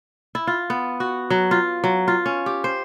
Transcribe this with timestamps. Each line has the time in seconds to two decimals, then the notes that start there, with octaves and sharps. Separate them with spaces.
0.35 E4
0.47 F4
0.70 B3
1.00 F#4
1.30 F#3
1.51 F4
1.84 F#3
2.08 F4
2.26 C#4
2.46 G4
2.64 C5